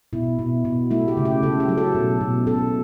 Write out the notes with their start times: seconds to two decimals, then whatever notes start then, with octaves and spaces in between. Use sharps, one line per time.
0.13 B2 E4
0.39 B2
0.65 B2
0.91 A3 E4
1.08 G4
1.17 C#3
1.25 G4
1.43 C#3 A4
1.60 G4
1.69 F#3
1.78 A4
1.95 B2
2.21 B2
2.47 B2 A4